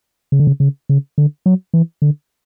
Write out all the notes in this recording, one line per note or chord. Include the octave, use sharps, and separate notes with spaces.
C#3
D3
C#3
C#3
C#3
D3
F#3
E3
D3